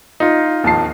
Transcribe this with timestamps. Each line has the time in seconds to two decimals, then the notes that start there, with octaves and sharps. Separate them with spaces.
0.20 D#4 F4
0.63 D1 D#2 F3 A5 C7